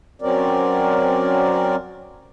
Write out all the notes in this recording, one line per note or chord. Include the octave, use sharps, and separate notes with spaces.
F#3 C4 C#4 A#4 D5